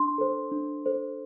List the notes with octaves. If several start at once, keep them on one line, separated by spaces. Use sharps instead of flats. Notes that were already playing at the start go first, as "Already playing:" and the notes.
Already playing: D4 C6
A4 C5
D4
A4 C5